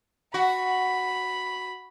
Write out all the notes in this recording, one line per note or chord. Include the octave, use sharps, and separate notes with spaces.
F#4 B5